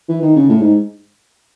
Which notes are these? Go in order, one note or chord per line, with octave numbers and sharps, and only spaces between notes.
E3
D#3
C#3
A2
G#2